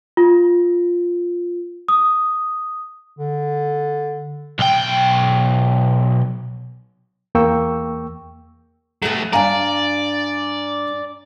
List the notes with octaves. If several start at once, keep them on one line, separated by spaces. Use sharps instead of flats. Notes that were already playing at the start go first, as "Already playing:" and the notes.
F4
D#6
D3
B1 G5
E2 A#3 G5 C#6 E6
F#3 A3 B3 G4 A4
G2 D4 D5 F5 G#5 A#5